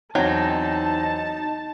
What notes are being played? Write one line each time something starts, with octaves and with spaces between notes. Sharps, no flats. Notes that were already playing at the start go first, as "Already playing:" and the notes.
E2 F#3 C4 D#4 G5 A5